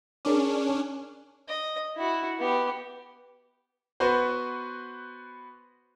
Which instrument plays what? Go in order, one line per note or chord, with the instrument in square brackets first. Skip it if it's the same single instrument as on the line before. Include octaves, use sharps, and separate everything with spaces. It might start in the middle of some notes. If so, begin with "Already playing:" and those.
[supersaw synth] C#4 D4 [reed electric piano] G#4 A#4 D6
[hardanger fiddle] D#5
E4 F#4
B3 G4
[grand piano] B3 F#4 B4 C5